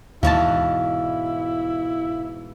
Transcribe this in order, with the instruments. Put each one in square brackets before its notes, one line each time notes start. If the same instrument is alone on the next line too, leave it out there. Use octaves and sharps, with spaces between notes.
[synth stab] D#2 A5 [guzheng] G#2 B2 E3 [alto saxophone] E4 [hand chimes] F5